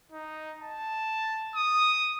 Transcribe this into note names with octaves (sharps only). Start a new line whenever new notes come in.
D#4
A5
D#6